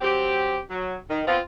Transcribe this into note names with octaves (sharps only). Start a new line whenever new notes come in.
F#3 C4 G4
F#3
D#3
B3 C4 F4